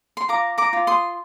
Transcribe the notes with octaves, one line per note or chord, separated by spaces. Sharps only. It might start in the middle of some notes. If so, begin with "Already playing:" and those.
C6
F4 A#5 D6
A#5 D6
F4
C6 D#6